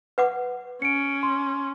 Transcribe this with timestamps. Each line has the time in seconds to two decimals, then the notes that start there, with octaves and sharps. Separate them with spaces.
0.18 B4 F#5 D6
0.82 C#4 C#7 D7
1.23 C6